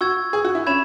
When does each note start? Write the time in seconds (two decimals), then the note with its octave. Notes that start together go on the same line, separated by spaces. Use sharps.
0.01 F#4 C#6 E6 G#6
0.33 G#4
0.45 F#4
0.55 E4
0.67 C#4 B5 G#6 E7